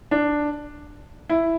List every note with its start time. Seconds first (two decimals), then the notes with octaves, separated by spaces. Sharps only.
0.11 D4
1.30 E4